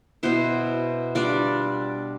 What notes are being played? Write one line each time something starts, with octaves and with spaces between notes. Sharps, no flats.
B2 B3 E4 C5
G3 D4 F4 D5